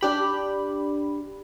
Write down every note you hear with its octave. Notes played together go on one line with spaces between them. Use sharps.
D4 G4 B5